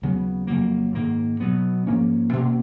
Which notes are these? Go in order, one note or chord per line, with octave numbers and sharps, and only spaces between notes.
D#2 C#3 F#3 B3
F2 C#3 F#3 A#3
G#2 D#3 A#3
B2 F#3 B3
G#2 F3 A#3 C#4
B2 A#3 C#4